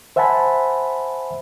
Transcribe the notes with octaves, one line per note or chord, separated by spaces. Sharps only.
C5 E5 F#5 G#5 A5 B5